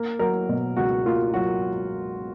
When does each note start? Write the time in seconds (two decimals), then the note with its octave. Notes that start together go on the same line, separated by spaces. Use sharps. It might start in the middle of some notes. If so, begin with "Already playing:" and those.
Already playing: A#3
0.19 F#3 A#4
0.49 B2
0.77 C#2 F#4
1.06 A#3 F4
1.34 F#3 F#4